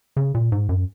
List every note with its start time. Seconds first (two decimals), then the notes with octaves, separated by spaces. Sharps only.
0.16 C#3
0.35 A#2
0.52 G#2
0.69 F#2